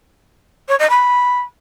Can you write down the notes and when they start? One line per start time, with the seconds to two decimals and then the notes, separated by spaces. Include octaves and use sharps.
0.68 C#5
0.79 D#5
0.90 B5